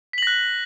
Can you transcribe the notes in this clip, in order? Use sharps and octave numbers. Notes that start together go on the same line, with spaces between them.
F#6 A#6 B6 F#7